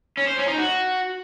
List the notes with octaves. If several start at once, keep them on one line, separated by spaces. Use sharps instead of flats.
C#4
C5
C#4
D#4
F#4